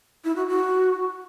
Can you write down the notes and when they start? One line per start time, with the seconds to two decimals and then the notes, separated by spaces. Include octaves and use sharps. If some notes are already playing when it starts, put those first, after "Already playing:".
0.24 E4
0.36 F#4
0.48 F#4